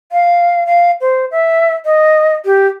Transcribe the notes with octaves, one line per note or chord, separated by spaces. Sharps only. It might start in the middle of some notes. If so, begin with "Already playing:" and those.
F5
F5
C5
E5
D#5
G4